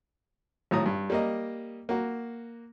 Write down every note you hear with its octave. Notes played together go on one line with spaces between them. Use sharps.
G#1 A2 F#3 A#5 D#6
G2
G3 A#3 D#5
A#3 F#4